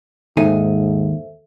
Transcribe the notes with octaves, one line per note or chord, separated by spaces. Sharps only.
D#2 G#2 D#4 A4 C5 E5 G#5